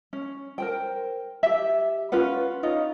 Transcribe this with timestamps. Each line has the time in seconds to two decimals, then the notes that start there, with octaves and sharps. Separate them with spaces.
0.13 C#4
0.58 A#4 C5 G5
1.43 G4 E5
2.12 C#4 F4 B4 F#5
2.63 C#4 D#4 F4